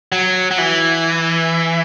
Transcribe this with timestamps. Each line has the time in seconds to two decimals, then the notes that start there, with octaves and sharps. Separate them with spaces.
0.12 F#3
0.51 F#3
0.58 E3